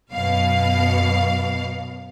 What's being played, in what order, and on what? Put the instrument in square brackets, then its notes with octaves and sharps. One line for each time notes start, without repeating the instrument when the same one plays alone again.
[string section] F#2 B2 F5